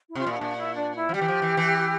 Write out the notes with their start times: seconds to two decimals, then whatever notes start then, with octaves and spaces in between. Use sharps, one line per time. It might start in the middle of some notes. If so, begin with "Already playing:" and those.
0.08 E4
0.15 C3 F4
0.27 A#2 E4
0.37 A#2 D4
0.56 E4
0.75 D4
0.95 E4
1.09 F3
1.13 G3 G4
1.21 E3
1.28 F3
1.42 E3
1.57 E3